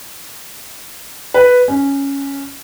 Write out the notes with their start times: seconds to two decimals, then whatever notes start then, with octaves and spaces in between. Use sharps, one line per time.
1.34 B4
1.68 C#4